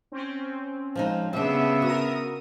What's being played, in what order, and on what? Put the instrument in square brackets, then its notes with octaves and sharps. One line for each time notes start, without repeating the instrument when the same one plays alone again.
[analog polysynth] C4 C#4
[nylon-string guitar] F3 G#3 D#4
[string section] C#3 [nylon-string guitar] G3 D4 [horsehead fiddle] B3 E5
[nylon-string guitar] F#4 [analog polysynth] A#4 D#6